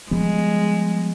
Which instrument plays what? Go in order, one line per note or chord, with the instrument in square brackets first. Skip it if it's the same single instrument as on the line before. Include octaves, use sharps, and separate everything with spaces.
[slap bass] F3 G3 B3 [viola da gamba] G#3